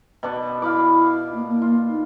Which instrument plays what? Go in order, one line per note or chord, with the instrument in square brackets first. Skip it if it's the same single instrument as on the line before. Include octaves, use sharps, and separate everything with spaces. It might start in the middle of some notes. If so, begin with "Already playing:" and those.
[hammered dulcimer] B2 D4 C#6
[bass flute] E4 [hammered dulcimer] F5 B5 D6
[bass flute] A#3
A#3
[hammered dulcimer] F4
[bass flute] D#4